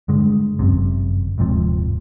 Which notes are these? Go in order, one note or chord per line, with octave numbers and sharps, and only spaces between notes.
G2 D3 G#3
G1 F#2 C3
D#1 G#2 C3 F3